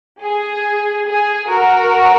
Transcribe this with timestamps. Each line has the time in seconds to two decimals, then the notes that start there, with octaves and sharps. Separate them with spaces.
0.22 G#4
1.06 G#4
1.49 F#4 A#4